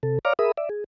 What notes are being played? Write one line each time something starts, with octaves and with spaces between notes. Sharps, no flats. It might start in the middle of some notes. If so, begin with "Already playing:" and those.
C3 A4
C#5 D5 F5 A#5 D6 F6
G#4 A#4 E5 B5 D#6
D5 E5
G#4